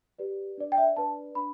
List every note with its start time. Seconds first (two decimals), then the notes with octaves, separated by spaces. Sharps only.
0.19 G4 B4 D5
0.58 D4 B4 D5
0.72 G5
0.77 E5
0.97 D4 B4 D5 A5
1.35 D4 B4 B5